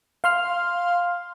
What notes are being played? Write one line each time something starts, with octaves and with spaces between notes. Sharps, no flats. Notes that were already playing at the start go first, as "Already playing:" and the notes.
F5 C6 F6